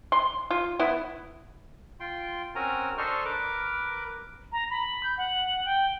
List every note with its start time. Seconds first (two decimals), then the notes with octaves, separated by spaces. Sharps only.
0.12 C6
0.51 F4
0.79 B3 E4
2.00 F4 G5 C6
2.55 C4 C#4 F#4 A#4 G#5 A#5
2.98 D4 A4 C5 D#5 C#6 F6
3.25 A#4 B4 D6
4.52 A#5
4.70 B5
5.03 G6
5.18 F#5
5.65 G5